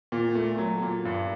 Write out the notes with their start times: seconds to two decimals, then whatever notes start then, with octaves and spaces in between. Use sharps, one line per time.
0.12 A#2
0.35 A3
0.58 F#3
0.82 A#2
1.05 G2